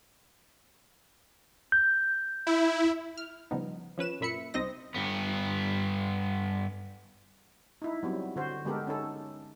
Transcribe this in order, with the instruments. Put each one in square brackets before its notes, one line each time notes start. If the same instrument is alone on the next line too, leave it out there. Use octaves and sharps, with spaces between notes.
[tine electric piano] G6
[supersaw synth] E4
[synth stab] F6
C#3 F3 G3 B3 D#4
F3 C#4 B4 E7
F#2 A#2 E5 B5 C#7
C2 C4 D#4 D#5 A#6
[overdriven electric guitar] G2 B3
[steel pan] D#4 E4
F#3 G3 B3 C4
D3 F#4 C5
D3 G#3 B3 G4 A4 A#4
C#4 D#4 A4